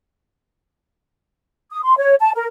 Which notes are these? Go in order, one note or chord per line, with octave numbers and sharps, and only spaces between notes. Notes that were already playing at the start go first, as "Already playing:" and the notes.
D#6
C6
C#5
A5
A#4